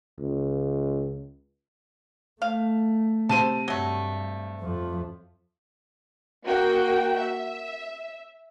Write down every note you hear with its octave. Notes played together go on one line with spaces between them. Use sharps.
C#2
A3 F5
C3 C5 A5 D#7
G2 F#3 A3
F2 F3
A#3 F#4 G5
E5